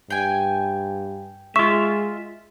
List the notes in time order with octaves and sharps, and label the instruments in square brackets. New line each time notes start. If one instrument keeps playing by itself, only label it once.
[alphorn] G2 [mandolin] G5 G#5
[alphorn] G#3 [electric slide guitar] F4 E5 [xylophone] C#6